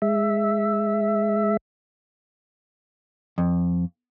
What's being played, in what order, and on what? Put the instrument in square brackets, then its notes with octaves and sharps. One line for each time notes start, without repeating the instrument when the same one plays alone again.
[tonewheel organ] G#3 E5
[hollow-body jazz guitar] F2